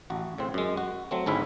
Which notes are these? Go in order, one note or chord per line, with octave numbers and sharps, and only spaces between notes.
A1 F#4
A2 C#3 C4
F#2 G#3
F#4
F#3 A3 C4
G#1 D2 G#2 C#4 E4 E5